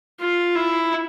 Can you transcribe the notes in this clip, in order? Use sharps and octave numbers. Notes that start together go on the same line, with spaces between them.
F4
E4